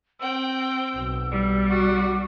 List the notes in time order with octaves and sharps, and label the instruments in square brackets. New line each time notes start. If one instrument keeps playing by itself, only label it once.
[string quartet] C4 G5 [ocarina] E6
[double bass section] B1
[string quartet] G3
[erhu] F#4 [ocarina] D6